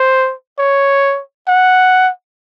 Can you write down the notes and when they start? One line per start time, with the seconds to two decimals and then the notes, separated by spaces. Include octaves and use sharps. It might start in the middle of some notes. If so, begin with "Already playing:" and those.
Already playing: C5
0.59 C#5
1.48 F#5